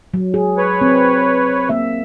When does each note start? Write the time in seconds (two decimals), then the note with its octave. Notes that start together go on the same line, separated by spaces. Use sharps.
0.14 F#3
0.34 G#4
0.57 B4 C#5
0.81 C4
1.69 A#3 E5